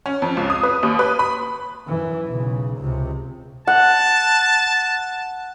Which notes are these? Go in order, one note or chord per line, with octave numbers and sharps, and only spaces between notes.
C#4
F2
C#2
D#6
B4
D#2
B4
B5
F#2 E3
B1 C#3
C#2 C3
F#5 A5